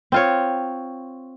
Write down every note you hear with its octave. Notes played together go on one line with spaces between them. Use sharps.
C4 F4 C#5